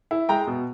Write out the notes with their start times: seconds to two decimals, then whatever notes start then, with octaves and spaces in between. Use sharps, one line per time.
0.11 E4
0.29 G#3 G5 A#5
0.47 B2